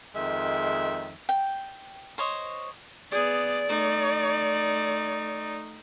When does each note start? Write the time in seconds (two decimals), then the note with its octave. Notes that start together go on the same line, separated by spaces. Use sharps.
0.15 F2 D#3 G#3 E5
1.29 G5
2.18 C5 C#5 D#5
3.12 B3 G#4 D5
3.67 A3 D#4